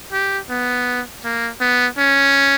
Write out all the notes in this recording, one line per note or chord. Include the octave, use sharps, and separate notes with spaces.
G4
B3
A#3
B3
C#4